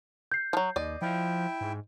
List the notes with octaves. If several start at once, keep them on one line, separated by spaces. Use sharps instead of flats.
G6 C7
F3 F#3
D#2 D5 D#5
F3 E4 G5
G#2